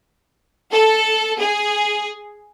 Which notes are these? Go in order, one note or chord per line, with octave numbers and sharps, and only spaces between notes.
A4
G#4